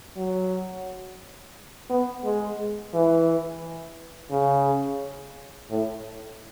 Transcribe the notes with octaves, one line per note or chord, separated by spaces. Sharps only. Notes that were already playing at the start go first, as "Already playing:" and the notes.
F#3
B3
G#3
E3
C#3
A2